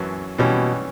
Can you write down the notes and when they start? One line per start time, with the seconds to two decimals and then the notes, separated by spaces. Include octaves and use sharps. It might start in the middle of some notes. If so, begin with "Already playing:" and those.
Already playing: F#2 E3 C#4
0.38 B2 E3 G3 C#4